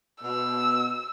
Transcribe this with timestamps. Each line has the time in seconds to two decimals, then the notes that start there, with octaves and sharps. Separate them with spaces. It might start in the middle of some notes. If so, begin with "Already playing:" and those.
0.22 B2 E6